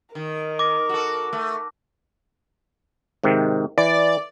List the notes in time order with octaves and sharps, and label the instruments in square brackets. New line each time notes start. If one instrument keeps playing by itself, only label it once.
[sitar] D#3 [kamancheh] A#4
[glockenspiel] D6 A#6
[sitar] F#4 A4
A3
[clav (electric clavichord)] G#2 C3 D#3
[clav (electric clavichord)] E3 [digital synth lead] D5